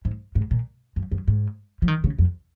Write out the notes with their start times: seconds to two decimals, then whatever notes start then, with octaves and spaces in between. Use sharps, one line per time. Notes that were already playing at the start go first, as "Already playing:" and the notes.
0.05 G#2
0.35 G#2
0.51 A#2
0.96 F#2
1.12 F#2
1.28 G#2
1.82 F3
1.88 D#3
2.04 C#3
2.19 F2